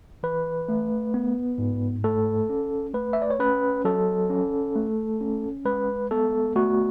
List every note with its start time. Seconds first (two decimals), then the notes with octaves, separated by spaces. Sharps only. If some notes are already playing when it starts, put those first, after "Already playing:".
0.23 E3 B4
0.69 A3
1.14 B3
1.58 G#2
2.04 A3 A4
2.50 C#4
2.94 A3 B4
3.13 E5
3.22 D5
3.30 C#5
3.40 C#4 B4
3.85 F#3 A4
4.30 C#4
4.76 A3
5.21 C#4
5.65 G#3 B4
6.11 B3 A4
6.56 A3 F#4